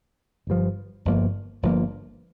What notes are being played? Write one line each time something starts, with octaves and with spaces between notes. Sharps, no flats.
G1 G2 F3
G1 G2 F3 A#3
G1 G2 F3 A#3